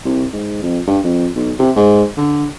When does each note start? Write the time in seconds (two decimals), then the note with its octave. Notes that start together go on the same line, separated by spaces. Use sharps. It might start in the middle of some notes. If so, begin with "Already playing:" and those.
0.05 C2
0.33 G#2
0.62 F2
0.87 G2
1.04 F2
1.36 B1
1.59 C3
1.76 G#2
2.17 D3